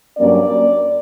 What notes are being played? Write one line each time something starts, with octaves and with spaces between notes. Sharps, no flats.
G2 F#3 A#3 C#4 D5